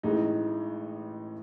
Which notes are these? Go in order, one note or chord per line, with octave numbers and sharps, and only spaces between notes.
A1 A2 E3 G#3 D#4